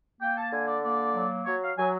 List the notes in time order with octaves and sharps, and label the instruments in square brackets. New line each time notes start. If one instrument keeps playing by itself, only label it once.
[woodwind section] A#3 G5
A5
D3 G#5
D5
A#3 D5
F#3
F#3 C#5
F5
F#3 G#5